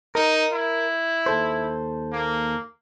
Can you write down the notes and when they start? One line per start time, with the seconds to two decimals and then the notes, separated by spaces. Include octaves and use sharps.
0.15 D#4 A#4
0.53 E4
1.26 D#2 A4 C5
2.12 A#3